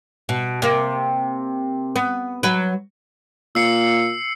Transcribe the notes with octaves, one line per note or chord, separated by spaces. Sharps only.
B2
C3 A#3
B3
F#3 B4
A#2 E6 C7 C#7